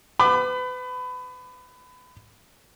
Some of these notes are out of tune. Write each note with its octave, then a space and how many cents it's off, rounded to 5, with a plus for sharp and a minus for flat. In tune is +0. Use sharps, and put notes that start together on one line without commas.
B4 +35 B5 +25 D6 +30